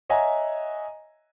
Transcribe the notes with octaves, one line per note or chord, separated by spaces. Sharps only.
C#5 D#5 E5 F#5 G#5 A#5